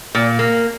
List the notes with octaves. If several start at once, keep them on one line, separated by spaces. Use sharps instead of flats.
A#2
A#3